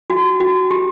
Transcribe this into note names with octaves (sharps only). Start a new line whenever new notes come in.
F#4
F#4
G4